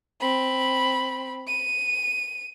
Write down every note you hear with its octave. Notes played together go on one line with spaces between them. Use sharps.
C4 B5
D#7